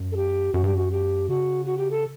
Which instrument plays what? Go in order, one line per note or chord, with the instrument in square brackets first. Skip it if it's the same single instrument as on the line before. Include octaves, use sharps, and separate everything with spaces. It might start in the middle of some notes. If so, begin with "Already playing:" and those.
Already playing: [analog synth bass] F#2
[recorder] A4
G4
[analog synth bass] F#2 [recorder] F#4
[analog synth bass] G2 [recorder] G4
[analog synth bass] F#2 [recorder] F#4
[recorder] G4
[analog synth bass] C#3 [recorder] F#4
[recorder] F#4
G4
A4